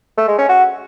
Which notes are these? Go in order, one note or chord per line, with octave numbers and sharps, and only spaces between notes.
A3
G#3
C#4
F#4